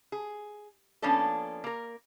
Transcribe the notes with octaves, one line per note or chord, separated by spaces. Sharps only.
G#4
F3 A#3 B3 C#4 D4 A4
A#3 A#4